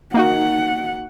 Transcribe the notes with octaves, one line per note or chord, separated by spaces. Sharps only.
A#3 D#4 F#4 F#5